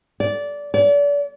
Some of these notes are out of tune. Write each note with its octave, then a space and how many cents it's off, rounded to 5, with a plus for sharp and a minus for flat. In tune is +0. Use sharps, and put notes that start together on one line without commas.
D5 -15
D5 -35